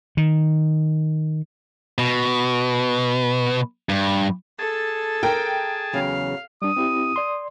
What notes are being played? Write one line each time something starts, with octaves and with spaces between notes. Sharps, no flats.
D#3
B2
G2
G#4 A4 A5
A#4 G5
E2 C#3 F#3 F5
G3 D4 D#6
C4 E4 G4
D5 C6